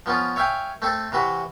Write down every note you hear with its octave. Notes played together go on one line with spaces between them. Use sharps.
F3 B3 C#4 F4
C#5 E5 F5 G5 G#5
A3 C4 A4
C3 E3 F#4 B5